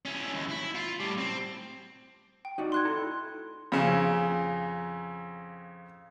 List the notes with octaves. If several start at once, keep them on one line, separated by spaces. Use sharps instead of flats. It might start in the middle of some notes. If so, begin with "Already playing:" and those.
C#4 E4
D#2
E4
F4
A2 G3
C4
G5
D#4 F#4 D5
C6 F#6 G#6
E4 A4 A#5
F2 C#3